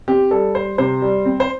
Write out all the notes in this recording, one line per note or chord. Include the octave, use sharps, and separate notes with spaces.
C4 G4
G3 A4
G3 C5
C3 C5
G3
C4
C5